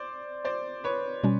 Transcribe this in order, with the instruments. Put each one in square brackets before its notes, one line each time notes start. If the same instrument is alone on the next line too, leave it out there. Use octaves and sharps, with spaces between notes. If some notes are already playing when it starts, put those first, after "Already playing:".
Already playing: [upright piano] C5 D5
C5 D5
B4 C#5
[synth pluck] B2 G3 C#4